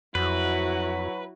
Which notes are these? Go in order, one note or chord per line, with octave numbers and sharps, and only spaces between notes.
F2 F#3 E4 F#4 B4